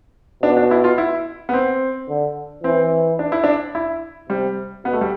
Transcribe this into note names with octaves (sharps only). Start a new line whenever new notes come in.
B2 D4
D4
E4
F4
E4
B3
C4
D3
E3 C4
D4
E4
D4
E4
C3 G3
B2 B3
A3
G3